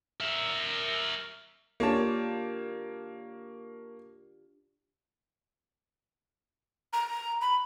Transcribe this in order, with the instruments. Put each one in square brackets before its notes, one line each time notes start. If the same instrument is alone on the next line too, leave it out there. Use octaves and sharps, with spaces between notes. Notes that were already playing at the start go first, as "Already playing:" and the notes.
[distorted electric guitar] A#4 E5
[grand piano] A#3 C#5 A5 [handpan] D4 F4 G4
[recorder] A#5
B5